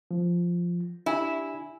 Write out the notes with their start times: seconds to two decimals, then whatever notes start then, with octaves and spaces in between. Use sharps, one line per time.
0.11 F3
1.06 D4 E4 G4 G#5